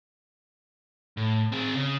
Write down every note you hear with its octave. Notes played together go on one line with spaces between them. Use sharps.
A2
C4 G#4
C#3